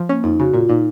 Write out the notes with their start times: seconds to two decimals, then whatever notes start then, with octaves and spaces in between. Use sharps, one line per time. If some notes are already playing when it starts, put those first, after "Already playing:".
Already playing: F3
0.09 A#3 C#4
0.24 F2 D#4
0.40 C#3 F#4
0.54 A#2 F4
0.69 A#2 D#4